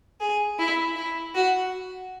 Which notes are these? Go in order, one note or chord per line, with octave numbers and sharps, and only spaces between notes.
G#4
E4
E4
F#4